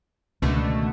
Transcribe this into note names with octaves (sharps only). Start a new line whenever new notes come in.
C#2 B2 D3 D#3 A3